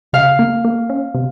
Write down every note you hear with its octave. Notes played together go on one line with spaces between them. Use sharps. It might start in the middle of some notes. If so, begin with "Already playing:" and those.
C#3 F5
A#3
A#3
C#4
C3